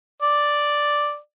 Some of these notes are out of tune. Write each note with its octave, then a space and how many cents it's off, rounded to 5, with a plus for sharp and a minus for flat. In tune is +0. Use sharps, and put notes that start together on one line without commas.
D5 +0